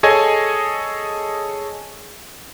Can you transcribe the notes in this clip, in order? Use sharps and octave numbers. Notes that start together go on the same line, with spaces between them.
G#4 A4 C#5 D#5 G#5